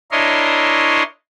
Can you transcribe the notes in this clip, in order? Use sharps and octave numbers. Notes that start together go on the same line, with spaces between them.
D4 E4 A#4 C#5 D#5 C6